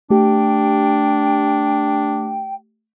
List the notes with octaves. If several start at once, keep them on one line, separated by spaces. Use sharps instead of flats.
A3 D4 G4 G5